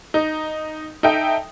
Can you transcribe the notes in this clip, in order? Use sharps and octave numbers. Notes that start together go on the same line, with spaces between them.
D#4
D#4 A4 E5 G5